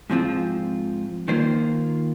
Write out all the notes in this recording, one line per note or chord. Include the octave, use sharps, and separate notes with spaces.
G#2 F3 C4 F4
D#3 A#3 F4 C5